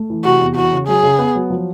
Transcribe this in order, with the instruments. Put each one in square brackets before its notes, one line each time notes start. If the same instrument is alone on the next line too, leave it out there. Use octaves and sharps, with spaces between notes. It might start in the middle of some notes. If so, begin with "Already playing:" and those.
Already playing: [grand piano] A3
E3
[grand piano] C3 [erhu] F#4
[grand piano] E2
[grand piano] E3 [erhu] F#4
[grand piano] C#3
[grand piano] F#3 [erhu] G#4
[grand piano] C#3
B3
F#3
F3